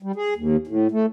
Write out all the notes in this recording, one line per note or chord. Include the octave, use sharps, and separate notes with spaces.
G3
G#4
D#2
A2
A3